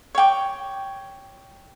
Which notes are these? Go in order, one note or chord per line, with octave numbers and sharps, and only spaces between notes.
C#5 G5 D6